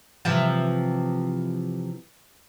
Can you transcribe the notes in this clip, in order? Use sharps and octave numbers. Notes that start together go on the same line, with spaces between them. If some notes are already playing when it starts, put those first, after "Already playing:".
C3 E3 F3